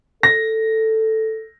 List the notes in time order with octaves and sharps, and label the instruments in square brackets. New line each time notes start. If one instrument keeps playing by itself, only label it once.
[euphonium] A4 [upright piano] A#6